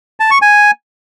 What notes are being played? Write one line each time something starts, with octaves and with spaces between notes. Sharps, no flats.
A5
C#6
G#5